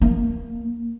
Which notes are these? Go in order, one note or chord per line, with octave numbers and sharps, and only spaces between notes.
A#3